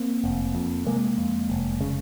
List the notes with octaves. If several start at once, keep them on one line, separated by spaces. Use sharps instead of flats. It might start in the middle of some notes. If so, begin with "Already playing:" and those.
Already playing: A#3 C4
F1
F2
C3 G#3 A#3
F2
F1
C#3